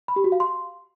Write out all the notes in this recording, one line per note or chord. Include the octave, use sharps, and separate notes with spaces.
B5
G4
F#4
F5
C6